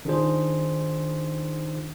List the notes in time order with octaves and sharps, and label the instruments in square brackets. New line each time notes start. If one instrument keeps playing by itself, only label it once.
[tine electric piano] D#3 D4 D#4 F4 G#4 C5